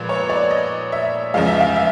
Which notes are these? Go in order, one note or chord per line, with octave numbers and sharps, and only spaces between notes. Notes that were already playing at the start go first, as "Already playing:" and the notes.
Already playing: A#2 F3 G#3 B3 B4
C#5
D5
D#5
E5
E2 C#3 F3 G#3 F5
E5
F5
E5